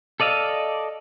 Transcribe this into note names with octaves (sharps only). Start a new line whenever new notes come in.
A4 D5 D#5 F5 E6